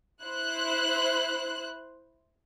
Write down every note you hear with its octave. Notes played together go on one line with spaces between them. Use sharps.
E4 C5 F#6